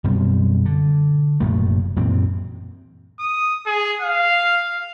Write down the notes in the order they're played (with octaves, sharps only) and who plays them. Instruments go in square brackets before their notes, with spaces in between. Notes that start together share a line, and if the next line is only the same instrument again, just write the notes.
[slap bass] F#2 B2 G3 C4
D3
F1 F#2 A#2 A3
F#2 A#2 E3 C4
[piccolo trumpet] D#6
G#4
F5